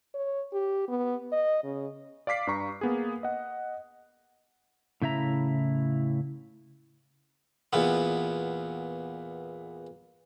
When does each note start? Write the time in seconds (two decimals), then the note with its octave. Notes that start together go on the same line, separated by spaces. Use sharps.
0.14 C#5
0.53 G4
0.88 B3
1.32 D#5
1.64 C#3
2.27 D5 F5 D6 B6 C7
2.47 G2 G3 A#5 C#6 B6
2.81 A#3 B3 G#4
3.23 D#5 F#5
5.02 A2 C#3 E4 E5 A#5
7.73 E2 A#2 B3